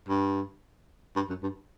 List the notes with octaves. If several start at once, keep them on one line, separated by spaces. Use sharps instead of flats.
G2
G2
F#2
G2